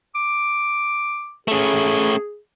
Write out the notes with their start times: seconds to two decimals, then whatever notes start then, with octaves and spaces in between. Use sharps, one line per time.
0.15 D6
1.48 A3 C#4 G#4